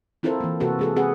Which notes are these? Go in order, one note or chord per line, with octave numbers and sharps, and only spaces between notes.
C4 E4 F4 A4 A#4 C5
E3 A#3
C3 A#3 F#4 A4 B4
G#3 G#4 A4
C4 G#4 B4 F#5